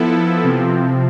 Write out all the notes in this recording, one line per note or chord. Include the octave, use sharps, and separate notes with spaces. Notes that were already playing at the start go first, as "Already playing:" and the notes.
Already playing: F3 B3 E4 A4
C3 F3 C4